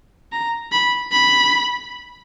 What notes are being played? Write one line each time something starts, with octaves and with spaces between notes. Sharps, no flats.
A#5
B5
B5